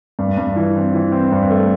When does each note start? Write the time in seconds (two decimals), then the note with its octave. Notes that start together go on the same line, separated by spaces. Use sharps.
0.19 G2
0.37 G2
0.56 E3
0.76 C4
0.94 E3
1.12 C4
1.32 G2
1.50 A3